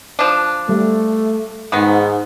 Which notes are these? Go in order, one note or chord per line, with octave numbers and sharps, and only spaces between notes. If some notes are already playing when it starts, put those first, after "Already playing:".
F3 D4
G3 A3
G#2 D#3 B3